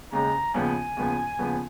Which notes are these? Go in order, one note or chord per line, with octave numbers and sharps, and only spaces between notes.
D#2 C#3 G#3 A#5
D#2 C#3 F3 B3 G#5
D#2 C#3 F3 B3
D#2 C#3 F3 B3